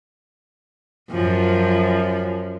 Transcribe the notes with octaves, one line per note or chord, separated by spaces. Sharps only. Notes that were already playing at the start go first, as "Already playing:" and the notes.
F#2 F3